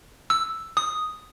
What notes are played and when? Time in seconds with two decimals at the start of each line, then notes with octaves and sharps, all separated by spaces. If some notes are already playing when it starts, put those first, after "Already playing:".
0.30 E6
0.77 D#6